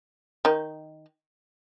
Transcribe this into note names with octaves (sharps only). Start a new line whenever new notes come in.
D#3 D#4